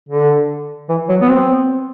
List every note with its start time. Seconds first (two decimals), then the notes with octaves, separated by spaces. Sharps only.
0.09 D3
0.89 E3
1.09 F#3
1.21 B3
1.29 C4